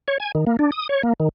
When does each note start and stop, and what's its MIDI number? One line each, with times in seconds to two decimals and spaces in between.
0.08 0.18 73
0.20 0.32 80
0.35 0.45 51
0.47 0.57 58
0.59 0.71 62
0.72 0.88 87
0.89 1.02 73
1.03 1.13 58
1.20 1.29 51